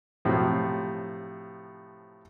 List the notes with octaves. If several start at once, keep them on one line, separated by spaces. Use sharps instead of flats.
A2 C3 F3 F#3